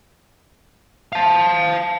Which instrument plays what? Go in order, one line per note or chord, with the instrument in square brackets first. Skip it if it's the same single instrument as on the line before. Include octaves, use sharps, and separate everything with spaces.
[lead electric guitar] F5 A5